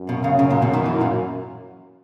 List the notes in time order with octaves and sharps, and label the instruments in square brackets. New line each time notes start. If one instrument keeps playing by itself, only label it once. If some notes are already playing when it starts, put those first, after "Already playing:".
Already playing: [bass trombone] F#2
[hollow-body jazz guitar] B2
C#3
C#3
A#2
B2
D#3
E3
A#2